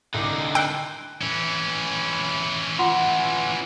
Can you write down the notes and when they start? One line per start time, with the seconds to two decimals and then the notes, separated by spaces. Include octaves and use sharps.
0.14 C2 D3 D#4 D6
0.55 G5 E6 F#6 C7
1.21 E3 C#4
2.79 F4 F#5 C6